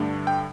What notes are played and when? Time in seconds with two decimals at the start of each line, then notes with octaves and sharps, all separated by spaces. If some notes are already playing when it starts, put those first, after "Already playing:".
Already playing: G2 D3 A3 D4
0.27 G5